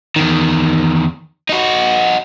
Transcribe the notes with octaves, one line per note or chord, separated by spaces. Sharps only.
E2 D#3
D#4 F#4